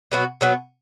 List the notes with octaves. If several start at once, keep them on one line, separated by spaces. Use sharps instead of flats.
B2 F#3 B3 F#4
B2 F#3 B3 F#4